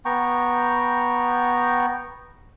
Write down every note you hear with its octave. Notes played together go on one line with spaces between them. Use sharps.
B3 G5 A#5 C#6